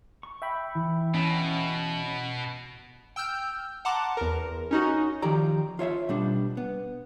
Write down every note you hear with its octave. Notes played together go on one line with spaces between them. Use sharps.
C#6
E5 G5 B5
E3
B2 C#4
G5 E6 F6 G6
F#5 A5 A#5 C6 D6
E2 A#4
C#4 D#4 F#4
D#3 F3 G4 D5 A#5
F4 C#5 E5 F5
B2 G3 D4
B3